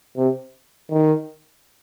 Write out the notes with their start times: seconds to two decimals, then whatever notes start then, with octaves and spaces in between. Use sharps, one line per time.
0.17 C3
0.90 D#3